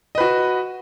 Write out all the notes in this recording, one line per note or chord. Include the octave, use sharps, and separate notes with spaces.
F#4 B4 D#5